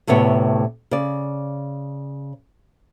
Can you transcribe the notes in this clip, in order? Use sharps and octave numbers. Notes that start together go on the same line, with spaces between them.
D2 A2 C3 B3 C#5
C#3 D5